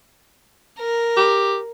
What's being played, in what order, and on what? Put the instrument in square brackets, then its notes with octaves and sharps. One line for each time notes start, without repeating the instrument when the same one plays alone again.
[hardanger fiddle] A#4
[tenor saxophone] G4